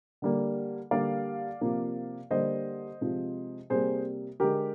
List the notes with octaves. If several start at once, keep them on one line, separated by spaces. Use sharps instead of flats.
D3 G3 A#3
D3 G3 A#3 D5 F5
C3 F3 A#3
D3 G3 A#3 C5 D#5
C3 F3 G#3
C3 G3 A#3 G#4 C5
D3 G#3 G4 A#4